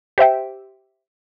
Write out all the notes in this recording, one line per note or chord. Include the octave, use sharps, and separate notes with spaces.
G4 C5 E5 G5